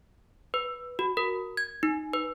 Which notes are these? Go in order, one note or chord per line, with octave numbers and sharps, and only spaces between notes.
B4
F#4
A#4
G#6
D#4
B4